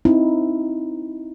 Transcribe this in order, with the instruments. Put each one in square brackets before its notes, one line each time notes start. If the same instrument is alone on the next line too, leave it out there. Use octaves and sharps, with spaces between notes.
[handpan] C4 D#4 E4